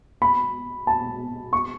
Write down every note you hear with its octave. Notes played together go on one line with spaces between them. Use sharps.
B5
A5
C#6